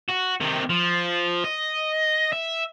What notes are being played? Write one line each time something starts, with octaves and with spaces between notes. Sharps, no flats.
F#4
C3 D#3
F3
D#5
E5